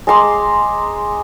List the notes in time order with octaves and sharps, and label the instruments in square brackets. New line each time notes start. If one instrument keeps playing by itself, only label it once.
[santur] G#3 A#5 C6 D6